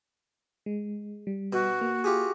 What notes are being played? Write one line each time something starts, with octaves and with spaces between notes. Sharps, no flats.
G#3
G3
B2 F#4
A#3
F4 G4 G#4